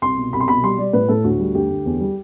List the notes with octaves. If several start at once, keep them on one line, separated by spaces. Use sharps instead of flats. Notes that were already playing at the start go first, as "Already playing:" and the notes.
C2 C6
B2
C2 B5
C6
B2 B5
G3 C6
G3 D5
A2 B4
A2 A4
D2 F#4
G3
D2 G4
D2
E2
G3